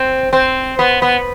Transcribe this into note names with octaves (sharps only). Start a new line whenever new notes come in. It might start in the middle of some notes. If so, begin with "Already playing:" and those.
Already playing: C4
C4
B3
B3